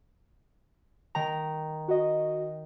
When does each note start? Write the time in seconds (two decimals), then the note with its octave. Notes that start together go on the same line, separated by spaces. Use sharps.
1.15 D#3 A#5
1.88 F#4 D#5